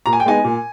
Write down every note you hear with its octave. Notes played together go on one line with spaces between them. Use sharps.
A#2 A#5
G#5
G5
G#3 B3 D#4 G#5
A#2